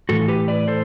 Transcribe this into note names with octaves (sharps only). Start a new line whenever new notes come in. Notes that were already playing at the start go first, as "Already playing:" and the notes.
A2 E3 F#4 A4
G4 B4
B4 D5
A4 C5